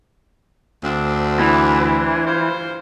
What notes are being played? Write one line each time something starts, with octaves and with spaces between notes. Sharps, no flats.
D2 C4 D4
E3
G2 F4 C5